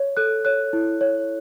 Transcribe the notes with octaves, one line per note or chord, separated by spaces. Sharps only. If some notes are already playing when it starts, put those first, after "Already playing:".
Already playing: C#5
A4 F#6
C#5 F#6
E4
C#5